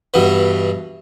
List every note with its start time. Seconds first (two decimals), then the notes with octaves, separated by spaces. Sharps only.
0.14 G2 B2 E3